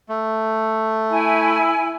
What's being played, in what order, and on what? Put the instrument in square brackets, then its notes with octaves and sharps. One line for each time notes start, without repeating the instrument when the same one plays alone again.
[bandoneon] A3
[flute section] E4 G#5